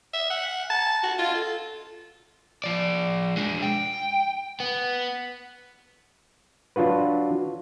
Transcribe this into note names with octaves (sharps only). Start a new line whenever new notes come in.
E5
F#5
A5
F#4
F4
A4
F3 D5
G#3 D4
G5
B3
F#3 D4 F4 F#4 B4